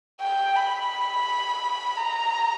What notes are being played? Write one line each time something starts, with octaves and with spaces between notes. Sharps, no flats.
G5
B5
A#5